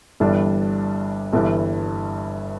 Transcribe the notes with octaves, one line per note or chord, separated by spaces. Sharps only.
G1 G2 E3 G3 D4
G1 G2 E3 G3